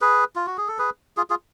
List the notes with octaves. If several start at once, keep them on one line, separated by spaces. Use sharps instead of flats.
G#4 B4
F4
F#4
G#4
A4
G#4 B4
F4 G#4
F4 G#4